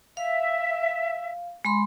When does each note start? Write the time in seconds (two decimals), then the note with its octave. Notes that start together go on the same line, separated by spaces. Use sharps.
0.17 E5 F5
1.65 G#3 B5 C6